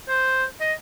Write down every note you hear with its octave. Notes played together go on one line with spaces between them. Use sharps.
C5
D#5